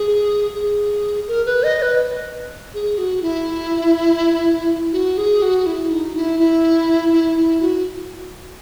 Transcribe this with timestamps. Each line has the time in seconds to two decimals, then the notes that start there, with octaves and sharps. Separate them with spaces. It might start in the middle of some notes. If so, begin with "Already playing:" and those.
Already playing: G#4
0.54 G#4
1.28 A#4
1.46 B4
1.63 D#5
1.82 B4
2.74 G#4
2.98 F#4
3.22 E4
4.92 F#4
5.18 G#4
5.42 F#4
5.66 E4
5.91 D#4
6.15 E4
6.40 E4
7.12 E4
7.37 E4
7.61 F#4